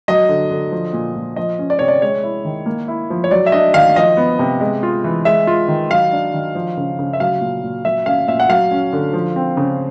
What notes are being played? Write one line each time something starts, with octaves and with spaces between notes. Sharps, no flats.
F#3 D#5
D3
D3
F3
A#2
A#2
F3 D#5
C#4
D5
C3 C#5
D5
G#3 C#5
E4
D#3
A#3
E4
F3
C#5
F#3 D5
E5
D4 D#5
D#3 F5
F3 D#5
B3
C3
G#3
F4
E3
G#3 E5
F4
D#3
F#3 F5
D4
D#3
F3
C#3
C#3
E5
F#3 F5
A#2
A#2
F#3 E5
C#4 F5
A#2 E5
F#5
F#3 F5
C#4
D3
F3
C4
C#3